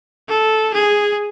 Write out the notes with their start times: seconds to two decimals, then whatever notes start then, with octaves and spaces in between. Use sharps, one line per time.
0.29 A4
0.74 G#4